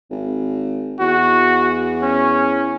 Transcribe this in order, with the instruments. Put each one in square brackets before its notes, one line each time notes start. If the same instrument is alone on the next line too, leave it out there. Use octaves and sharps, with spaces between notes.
[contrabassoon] G#1
[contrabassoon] E2 [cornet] F#4
[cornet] C#4